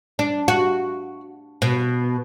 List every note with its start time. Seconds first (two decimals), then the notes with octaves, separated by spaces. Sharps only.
0.19 D4
0.48 F#4
1.62 B2